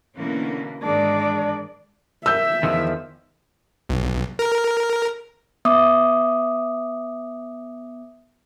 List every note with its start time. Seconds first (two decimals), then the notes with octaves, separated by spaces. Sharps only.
0.16 B2 D3 E3 A#3 C#4
0.83 G#2 D#3 E3 G#3 D4 D5
2.26 E5 E6 G6
2.63 E2 D#3 F3
3.89 B1
4.39 A#4
5.65 B3 E5 D6 D#6